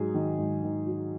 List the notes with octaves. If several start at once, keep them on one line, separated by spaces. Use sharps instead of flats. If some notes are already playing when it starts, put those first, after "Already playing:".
Already playing: G#2 F#3 G#4
D#3
G#2
D#3
F#3